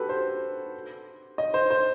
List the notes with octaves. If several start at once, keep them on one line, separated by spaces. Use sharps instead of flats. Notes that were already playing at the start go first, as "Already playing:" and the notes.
Already playing: F#4 G4 A4 B4
C5
D#5
C5
C5